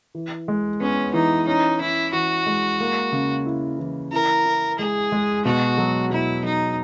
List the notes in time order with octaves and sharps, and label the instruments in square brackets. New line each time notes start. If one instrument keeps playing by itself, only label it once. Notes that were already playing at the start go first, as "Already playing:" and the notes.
[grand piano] E3
G#3
[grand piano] B3 [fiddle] C#4
[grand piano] E3 [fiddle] D#4
[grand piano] C#4 [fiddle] D#4
[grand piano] C#4 [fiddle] E4
[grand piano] E3 [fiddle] F#4
[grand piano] G#3
A#3
C#3
E4
E3
[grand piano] E4 [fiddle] A#4
[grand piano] E4
[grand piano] G#3 [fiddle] G#4
[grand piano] G#3
[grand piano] B2 [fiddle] F#4
[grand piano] F#3
[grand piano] B2 [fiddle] E4
[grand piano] F#3 [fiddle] D#4